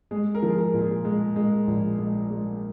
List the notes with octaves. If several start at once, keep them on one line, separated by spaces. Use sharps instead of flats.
G#3 G#4
A#4
F3 G#4
A#4
A#2
G#4
G#3
G#3
A#1
G#3
G#3